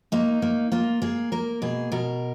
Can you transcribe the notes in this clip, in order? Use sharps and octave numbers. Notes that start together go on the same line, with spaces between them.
A#3 D#4
A#3
A#3 F4
A#3 G#4
A#3 A#4
B2 G#4
B2 A#4